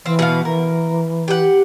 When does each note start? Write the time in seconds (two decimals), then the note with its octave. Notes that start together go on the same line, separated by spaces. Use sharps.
0.06 E3 C4 F4
0.19 B2 B3 F5
0.45 E3 A#4
1.28 G4 F#5